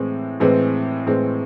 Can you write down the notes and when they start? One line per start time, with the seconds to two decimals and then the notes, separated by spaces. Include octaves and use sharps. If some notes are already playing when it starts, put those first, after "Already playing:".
Already playing: A2 E3 G#3 C4
0.40 A2 E3 G#3 C4
1.07 A2 E3 G#3 C4